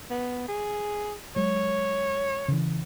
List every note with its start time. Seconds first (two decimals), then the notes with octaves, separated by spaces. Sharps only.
0.10 B3
0.49 G#4
1.36 F#3 G#3 C#5
2.48 C#3 E3